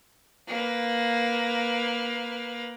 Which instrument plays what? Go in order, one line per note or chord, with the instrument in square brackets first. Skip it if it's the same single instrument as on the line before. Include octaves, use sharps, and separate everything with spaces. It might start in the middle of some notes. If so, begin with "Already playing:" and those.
[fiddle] A#3 B4